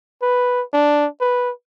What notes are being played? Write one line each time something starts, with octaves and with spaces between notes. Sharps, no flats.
B4
D4
B4